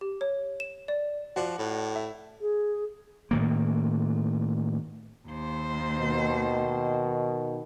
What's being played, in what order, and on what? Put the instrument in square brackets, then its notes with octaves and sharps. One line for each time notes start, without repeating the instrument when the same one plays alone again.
[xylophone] G4
C#5
E7
D5
[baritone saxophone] F3 [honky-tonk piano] F#4 D5
[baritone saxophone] A2
[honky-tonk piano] E5
[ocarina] G#4
[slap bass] A2 D#3 A#3
[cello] D#2 C5
[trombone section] B2 D#3